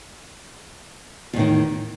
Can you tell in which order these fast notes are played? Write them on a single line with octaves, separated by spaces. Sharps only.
E2 A2 D#3